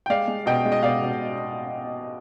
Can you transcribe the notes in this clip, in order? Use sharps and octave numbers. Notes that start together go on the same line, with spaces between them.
G5
G#3 D5 F5
G#3
B2 D#5 G5
G#3
D#5
B2 D5 F5
B2